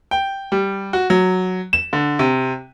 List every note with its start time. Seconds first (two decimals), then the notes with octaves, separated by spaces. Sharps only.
0.11 G5
0.52 G3
0.93 F#4
1.10 F#3
1.73 E7
1.93 D3
2.19 C3